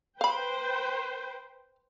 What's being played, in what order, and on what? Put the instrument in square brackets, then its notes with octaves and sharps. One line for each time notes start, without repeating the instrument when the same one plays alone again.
[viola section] B4 C5 G5 [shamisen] F5 B5